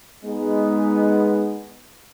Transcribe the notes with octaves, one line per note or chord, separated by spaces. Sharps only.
G#3 B3 D#4